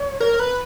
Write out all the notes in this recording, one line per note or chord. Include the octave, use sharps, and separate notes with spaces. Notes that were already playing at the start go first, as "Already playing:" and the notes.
Already playing: C#5
A#4
B4